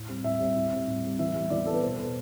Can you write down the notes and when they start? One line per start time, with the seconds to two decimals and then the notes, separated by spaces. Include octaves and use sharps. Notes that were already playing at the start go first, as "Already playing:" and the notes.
Already playing: A2
0.08 G3 C4
0.24 A2 E5
0.40 G3 C4
0.56 A2
0.71 G3 C4
0.88 A2
1.04 G3 C4
1.19 E3 E5
1.35 G3 B3
1.50 E3 D5
1.66 G3 B3 A4
1.74 B4
1.82 B2 C5
1.98 B3